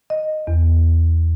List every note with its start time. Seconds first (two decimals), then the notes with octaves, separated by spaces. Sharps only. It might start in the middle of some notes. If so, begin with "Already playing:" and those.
0.10 D#5
0.47 E2